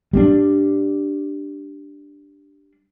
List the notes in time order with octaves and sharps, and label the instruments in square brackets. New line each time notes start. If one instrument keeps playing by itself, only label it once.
[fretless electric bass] G3 A#3 D4